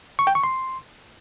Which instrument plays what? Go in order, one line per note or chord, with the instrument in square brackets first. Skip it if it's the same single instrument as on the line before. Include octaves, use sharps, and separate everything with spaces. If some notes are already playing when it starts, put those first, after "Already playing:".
[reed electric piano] C#6
G5
C#6
C6